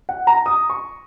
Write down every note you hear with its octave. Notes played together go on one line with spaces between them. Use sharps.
F#5
A#5
D#6
C#6